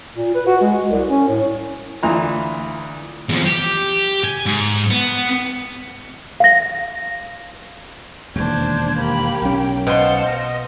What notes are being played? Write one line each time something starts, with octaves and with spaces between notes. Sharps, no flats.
A#2
B4
F#4
G#3
C2
C#4
A2
D2 E3 F4 A#5
E2 F3
G4
G#5
G#2
B3
F5 A#6
E1 D#2 D4 C5 G6 G#6
A#3 G4 B5
B1 C#4 G5
B2 C5 F5 F#5 A5 C6
D#5